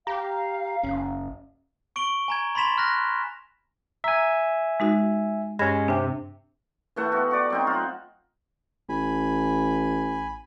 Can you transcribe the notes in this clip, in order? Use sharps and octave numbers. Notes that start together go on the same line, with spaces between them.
G4 F5 A#5
F#1 C#4
C#6 D7 F#7 G7
G#5 A#5 G#6
B5 C6 A6 B6 E7 F7
F6 F#6 A#6
E5 G#5 A#5
G#3 D#4 F#4
G2 G#3 C#4 G#6 A#6
C3 D4 G5
E3 A3 F#5 A5
B3 F#4
F#4 D5
F#3 C4 D#4
F4 F#5
A1 G#5 B5